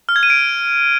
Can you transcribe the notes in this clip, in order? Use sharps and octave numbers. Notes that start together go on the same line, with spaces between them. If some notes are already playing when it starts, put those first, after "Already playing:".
F6
G#6
D#7
D7